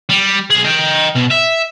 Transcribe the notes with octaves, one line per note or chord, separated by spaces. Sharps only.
G3
B1 G#4
D#5 G5
B2
E5